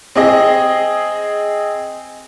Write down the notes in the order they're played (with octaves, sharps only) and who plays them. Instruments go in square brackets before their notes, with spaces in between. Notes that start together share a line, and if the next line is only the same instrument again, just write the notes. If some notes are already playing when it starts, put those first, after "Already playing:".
[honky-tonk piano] C4 G#4 D#5